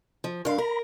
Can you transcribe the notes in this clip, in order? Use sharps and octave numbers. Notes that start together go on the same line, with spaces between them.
F3
G2 D4 A#4 F5 C6
A#4 A#5 B5